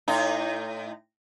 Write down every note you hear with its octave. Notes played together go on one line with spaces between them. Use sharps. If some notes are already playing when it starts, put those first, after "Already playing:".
A2 D#4